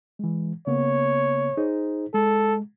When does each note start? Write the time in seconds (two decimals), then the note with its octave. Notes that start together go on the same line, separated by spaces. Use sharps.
0.19 E3 G#3
0.67 C#3 A#3 B3 C#5
1.57 D#4 G#4 C5
2.14 G#3 A4